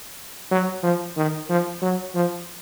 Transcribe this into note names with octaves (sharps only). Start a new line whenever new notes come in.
F#3
F3
D#3
F3
F#3
F3